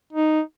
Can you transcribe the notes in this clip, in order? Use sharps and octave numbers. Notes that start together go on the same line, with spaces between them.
D#4